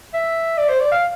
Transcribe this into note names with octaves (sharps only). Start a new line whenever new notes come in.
E5
D5
C5
D5
F5